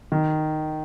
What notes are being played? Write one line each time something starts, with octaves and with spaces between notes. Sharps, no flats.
D#3